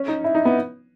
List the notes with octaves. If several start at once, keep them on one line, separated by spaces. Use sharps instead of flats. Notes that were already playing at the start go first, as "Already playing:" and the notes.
Already playing: C#4
D#4
E4
D#4
B3